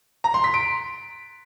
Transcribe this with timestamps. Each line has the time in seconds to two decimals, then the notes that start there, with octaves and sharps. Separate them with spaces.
0.24 A#5
0.34 C6
0.44 B6
0.54 D7